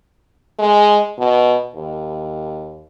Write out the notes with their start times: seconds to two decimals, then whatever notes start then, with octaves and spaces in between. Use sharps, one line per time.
0.59 G#3
1.18 B2
1.75 D#2